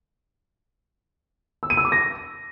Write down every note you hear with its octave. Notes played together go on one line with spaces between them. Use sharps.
E6
D#7
E6
D6
A#6